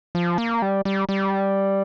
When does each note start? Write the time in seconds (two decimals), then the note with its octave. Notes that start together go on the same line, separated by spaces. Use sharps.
0.15 F3
0.38 A#3
0.62 G3
0.85 G3
1.09 G3